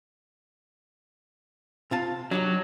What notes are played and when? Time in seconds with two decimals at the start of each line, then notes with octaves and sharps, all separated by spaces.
1.91 C3 F4 A5
2.31 F#3 D4 D#4 G4